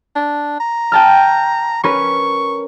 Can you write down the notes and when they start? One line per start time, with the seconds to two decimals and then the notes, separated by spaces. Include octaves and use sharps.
0.16 D4
0.60 A#5
0.92 G5 A5 F6
1.84 C#4 A#4 B4 C#6